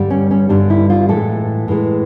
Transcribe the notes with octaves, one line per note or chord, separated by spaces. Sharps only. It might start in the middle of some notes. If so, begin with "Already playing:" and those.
Already playing: G2 D3 G3
C#4
C#4
G2 D3 G3 D4
E4
F4
A2 E3 G#3 A4
A2 E3 G#3